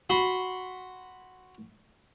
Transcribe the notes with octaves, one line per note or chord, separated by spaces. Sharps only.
F#4 B5 C6